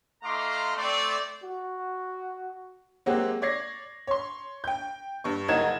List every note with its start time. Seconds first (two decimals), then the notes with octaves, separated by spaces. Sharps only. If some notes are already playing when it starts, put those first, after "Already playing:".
0.23 A3 D#4 F5 A#5 C6 D6
0.76 A3 C4 D5
1.44 F#4
3.06 F#3 G#3 A#3 C4 F#4 G4
3.42 C#5 D5 G#6 A#6 C7
4.07 C#5 C6
4.64 G5 G6
5.24 G2 C#6
5.48 F#1 C2 D#4 A#4 G#6 E7